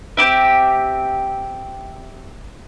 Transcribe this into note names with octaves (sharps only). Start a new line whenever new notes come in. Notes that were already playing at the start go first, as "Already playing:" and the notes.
C4 E4 G4 E5